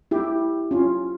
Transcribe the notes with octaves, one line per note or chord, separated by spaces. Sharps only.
E4 G4
C#4 F4